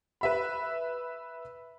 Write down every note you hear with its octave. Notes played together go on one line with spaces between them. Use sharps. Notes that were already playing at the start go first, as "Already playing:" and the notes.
B4 E5 B5